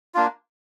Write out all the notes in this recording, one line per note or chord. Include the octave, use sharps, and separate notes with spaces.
A#3 D4 F4